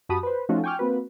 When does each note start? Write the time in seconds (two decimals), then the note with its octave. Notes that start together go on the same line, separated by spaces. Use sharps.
0.09 F#2 F#4 G4 A5 B5 D#6
0.23 B4 C5
0.49 F3 A3 C#4 D#4 F4 F#4
0.64 G5 G#5 C#6 D6 F6
0.79 A#3 C4 F#4 B4